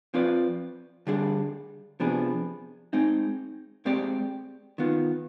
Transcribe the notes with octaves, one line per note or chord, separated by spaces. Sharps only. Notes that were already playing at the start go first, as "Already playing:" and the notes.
F3 C4 F4 B4 D5
D3 G3 D4 G#4
C3 F3 B3 D4 G#4
G#3 C4 D#4
G#3 C4 G4 D5
D#3 B3 F4